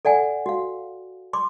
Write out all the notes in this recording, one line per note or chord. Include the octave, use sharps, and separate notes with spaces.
A4 D5 F#5 G#5
F#4 F5
C6 D6